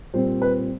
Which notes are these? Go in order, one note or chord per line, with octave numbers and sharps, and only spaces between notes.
A#2 G3 C4 C5
B4